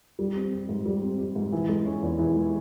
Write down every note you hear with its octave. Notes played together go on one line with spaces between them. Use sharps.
G3
C4
G4
G#2
G3
C4
G4
G#2
E3
G#3
C#4
E2
E3
G#3